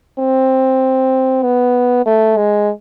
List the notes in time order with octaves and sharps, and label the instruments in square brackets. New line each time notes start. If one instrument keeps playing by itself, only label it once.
[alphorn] C4
B3
A3
G#3